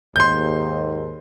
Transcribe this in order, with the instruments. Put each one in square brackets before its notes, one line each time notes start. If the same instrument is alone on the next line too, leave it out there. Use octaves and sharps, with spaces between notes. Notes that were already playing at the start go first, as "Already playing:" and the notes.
[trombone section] D#2 G#2 [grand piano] C6 G6